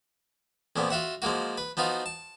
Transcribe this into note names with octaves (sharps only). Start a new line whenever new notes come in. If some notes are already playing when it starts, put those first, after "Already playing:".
F2 A#2 F3 B3
F4 F#4 E5 F#5
F3 G#3 A#3 F#4
B4
F3 B3 D#4 F4 F#4
A5